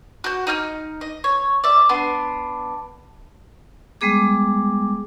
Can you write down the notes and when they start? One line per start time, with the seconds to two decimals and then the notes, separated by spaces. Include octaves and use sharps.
0.24 F#4 G6
0.47 D#4 D#5 F6 G6
1.01 D#5
1.24 C#5
1.64 D5 E5
1.89 B3 D4 C6
4.01 G3 G#3 B3 G#4 D6